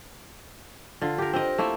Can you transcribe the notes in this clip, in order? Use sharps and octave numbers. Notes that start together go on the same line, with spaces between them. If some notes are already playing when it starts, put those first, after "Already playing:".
D3 F4
G4 A#4
C4 A#4 D#5
A3 A#3 E4 E5